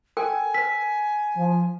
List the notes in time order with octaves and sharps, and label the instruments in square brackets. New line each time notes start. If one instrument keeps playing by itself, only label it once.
[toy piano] A4 A#4 G5 [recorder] G#5
[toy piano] A#4 B4 [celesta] B6
[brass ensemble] F3